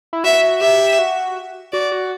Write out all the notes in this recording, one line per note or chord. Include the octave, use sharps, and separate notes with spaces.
E4
F#4 E5
G4 E5
F#4
F#4 D5
F#4